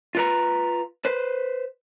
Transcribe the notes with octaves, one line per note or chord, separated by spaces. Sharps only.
F4 B4 A#5
B4 C5